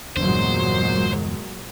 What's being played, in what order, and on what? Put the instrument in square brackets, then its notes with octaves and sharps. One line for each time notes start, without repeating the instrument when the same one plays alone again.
[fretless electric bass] G1 E2 D4 [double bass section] A#2 F#3 G#3 [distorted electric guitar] C5